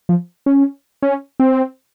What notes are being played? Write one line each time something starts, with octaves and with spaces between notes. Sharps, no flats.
F3
C#4
C#4
C4